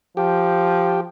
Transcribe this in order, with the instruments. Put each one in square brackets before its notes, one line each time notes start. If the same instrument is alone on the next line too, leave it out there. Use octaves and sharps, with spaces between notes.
[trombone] F3 [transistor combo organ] G4